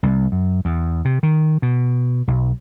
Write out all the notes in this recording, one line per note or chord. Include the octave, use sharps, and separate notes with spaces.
C2
F#2
E2
C3
D#3
B2
B1